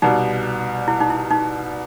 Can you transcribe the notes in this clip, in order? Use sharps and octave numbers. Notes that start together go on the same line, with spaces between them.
C2 B2 G3 D#4
E4
D#4
E4
D#4